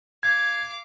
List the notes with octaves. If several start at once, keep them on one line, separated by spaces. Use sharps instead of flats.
F5 D6 G#6